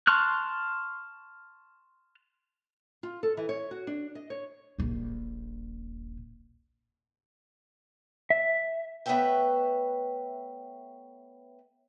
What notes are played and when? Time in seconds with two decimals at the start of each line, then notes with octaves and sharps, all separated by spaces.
0.07 A5 C6 C#6 F6 F#6
3.03 F4
3.23 A4
3.37 E3
3.49 C#5
3.71 F#4
3.87 D4
4.15 D#5
4.30 C#5
4.78 D#1 A#1
8.30 E5
9.06 A3 B3 B4 C#5 E5 G5